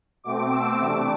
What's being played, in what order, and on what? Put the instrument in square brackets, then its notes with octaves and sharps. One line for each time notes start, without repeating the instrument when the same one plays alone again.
[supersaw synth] B2 A3 C4 D6
E6
C3 E3 A3 D4 D6